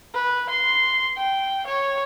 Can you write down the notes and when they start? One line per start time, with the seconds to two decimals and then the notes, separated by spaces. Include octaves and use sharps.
0.14 B4
0.49 C6
1.17 G5
1.67 C#5